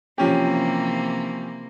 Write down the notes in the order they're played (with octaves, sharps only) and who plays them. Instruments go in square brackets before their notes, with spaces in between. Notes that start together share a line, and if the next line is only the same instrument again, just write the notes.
[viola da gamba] C3 E3 A#3 [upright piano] F3 C#4 G4